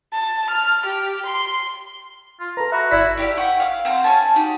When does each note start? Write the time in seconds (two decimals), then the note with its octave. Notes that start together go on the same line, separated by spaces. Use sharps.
0.13 A5
0.50 F6
0.85 G4
1.26 C6
2.40 F4
2.57 A4 B4 A#5
2.72 F#4 E5 B5
2.91 G1 E4 D5 B6
3.17 E4 G4 E5 F5
3.37 F#5 G5 C#6 D#6
3.60 F5 F6
3.85 C4 F#4 A#4 C5
4.04 C#4 C#5 G#5 A5
4.36 D#4 F#4 G4